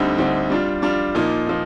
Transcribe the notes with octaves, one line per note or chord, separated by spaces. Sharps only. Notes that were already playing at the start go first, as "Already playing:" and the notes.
Already playing: D2 D3 G3 C4 D#4
D2 D3 G3 C4 D#4
G3 D4 F4
G3 D4 F4
A#2 F3 A#3 D#4
F3 A#3 D#4